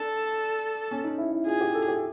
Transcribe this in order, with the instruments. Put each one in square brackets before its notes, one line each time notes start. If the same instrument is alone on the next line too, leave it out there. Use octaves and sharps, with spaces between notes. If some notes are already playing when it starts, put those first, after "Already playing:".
Already playing: [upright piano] D4 [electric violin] A4
[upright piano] C#4
D#4
E4
E4
[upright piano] F4 [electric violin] G#4
[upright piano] G4
A4
G4